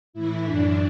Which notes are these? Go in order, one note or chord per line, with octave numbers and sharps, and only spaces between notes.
A2 E3 E4
F#2 E3 D4